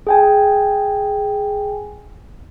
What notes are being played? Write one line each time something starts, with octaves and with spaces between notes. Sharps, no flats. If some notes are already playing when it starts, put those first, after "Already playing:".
G#4 G5 G#5